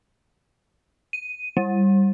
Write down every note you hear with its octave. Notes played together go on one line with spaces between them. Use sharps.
D#7
G3